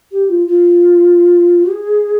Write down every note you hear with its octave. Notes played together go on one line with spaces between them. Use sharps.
G4
F4
F4
G#4